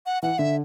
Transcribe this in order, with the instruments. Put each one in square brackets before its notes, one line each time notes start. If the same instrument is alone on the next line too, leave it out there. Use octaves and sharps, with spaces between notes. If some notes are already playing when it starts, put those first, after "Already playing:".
[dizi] F#5
[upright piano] E3 [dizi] F#5
[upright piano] D3 [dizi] E5